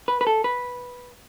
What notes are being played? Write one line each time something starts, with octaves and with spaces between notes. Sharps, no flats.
B4
B4
A4
B4